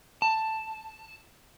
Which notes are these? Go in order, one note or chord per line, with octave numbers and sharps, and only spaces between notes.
A5